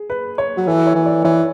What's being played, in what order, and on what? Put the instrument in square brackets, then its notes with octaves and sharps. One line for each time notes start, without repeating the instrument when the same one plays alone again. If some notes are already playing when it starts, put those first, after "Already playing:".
Already playing: [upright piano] G#4
B4
C#5
[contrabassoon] F#3
[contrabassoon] E3 [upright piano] A4
[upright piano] C#5
[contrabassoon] E3
[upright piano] D5
[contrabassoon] E3 [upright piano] C#5